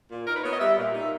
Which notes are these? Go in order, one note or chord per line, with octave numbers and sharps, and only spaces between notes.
A#2
D#4 A#4
B4
B3 C#5
D#5
G3 E5
A#2
D#4
E5